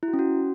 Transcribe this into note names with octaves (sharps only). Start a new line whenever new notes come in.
E4
F#4
C#4
F#4